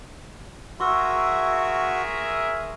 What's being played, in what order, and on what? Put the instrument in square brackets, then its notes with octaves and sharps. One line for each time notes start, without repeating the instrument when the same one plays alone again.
[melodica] F#4 [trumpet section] G#4 A#4 E5 [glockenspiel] C6 C#6 E6